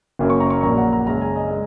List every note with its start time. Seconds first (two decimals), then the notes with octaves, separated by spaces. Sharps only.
0.19 F#1 F#2 F#3 A#3
0.30 C#6
0.40 A#5
0.50 C#6
0.63 A#1 A#2 F#3 A#3 A#5
0.78 F#5
0.93 A#5
1.07 F#2 C#3 G#3 A#5
1.22 G#5
1.36 D#5
1.50 G#3